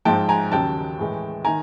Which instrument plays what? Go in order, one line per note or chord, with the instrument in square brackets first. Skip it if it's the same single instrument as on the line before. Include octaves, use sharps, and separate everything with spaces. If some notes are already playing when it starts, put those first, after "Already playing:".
[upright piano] G#2 F3 G#3 G5 A5
G#5 A#5
D#2 C#3 F#3 G5 A5
A2 E3 G#3
D#3 G#5 A#5